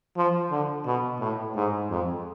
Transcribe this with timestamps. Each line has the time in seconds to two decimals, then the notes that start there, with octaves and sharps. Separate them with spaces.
0.17 F3
0.51 D3
0.85 B2
1.20 A2
1.55 G#2
1.90 F2